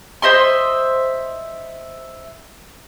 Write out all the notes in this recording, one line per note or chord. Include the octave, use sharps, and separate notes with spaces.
C5 D#5 E5 C6